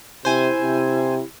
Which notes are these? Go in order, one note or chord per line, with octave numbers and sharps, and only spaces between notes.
C3 E4 C5 G#5
C3